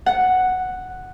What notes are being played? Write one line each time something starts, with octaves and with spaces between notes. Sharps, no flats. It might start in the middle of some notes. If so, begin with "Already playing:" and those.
F#5